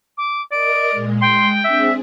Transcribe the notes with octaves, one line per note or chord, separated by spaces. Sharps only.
D6
A#4 D5 D#5 D7
A#2 G#3
G#3 G5 C6
C4 D4 G#4 E5